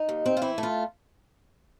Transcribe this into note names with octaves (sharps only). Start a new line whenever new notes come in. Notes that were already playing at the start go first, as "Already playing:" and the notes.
Already playing: D#4
D#2
C4
F4
E3 E4
A3
F4